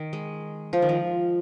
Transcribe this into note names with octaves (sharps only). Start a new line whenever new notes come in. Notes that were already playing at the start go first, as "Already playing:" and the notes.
Already playing: D#3
G#3
F3
D#3
F3